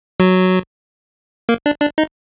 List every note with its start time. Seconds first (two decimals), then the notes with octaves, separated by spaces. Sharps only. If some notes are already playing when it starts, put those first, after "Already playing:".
0.20 F#3
1.49 A#3
1.66 D4
1.81 D4
1.98 D#4